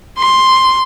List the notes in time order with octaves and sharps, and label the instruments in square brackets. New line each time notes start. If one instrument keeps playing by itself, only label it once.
[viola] C6